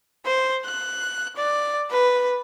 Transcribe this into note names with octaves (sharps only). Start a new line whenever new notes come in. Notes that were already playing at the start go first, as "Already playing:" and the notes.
C5
F#6
D5
B4